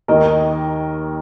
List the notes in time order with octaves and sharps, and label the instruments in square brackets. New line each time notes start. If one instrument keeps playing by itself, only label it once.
[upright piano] D#2 D#3 A#4 D#5